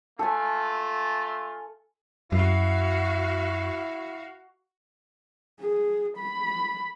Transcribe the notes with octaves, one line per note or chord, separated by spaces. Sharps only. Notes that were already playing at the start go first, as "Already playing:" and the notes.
A3 F4 A4 G#5
F#2 E4 F#4 F5
G#4
B5